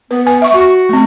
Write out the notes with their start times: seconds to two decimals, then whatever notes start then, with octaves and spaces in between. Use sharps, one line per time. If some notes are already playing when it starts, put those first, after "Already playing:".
0.11 B3 B4
0.27 G#5
0.42 E5 C#6
0.54 F#4 C#6
0.89 A3 C4